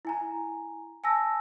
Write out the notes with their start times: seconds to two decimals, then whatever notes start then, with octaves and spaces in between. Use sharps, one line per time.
0.05 E4 G#5 A#5
1.04 G#5 A5 E6 A#6